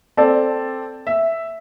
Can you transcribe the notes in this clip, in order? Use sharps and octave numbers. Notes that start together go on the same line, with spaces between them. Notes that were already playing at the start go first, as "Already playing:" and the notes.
C4 A4 D5 A5
E5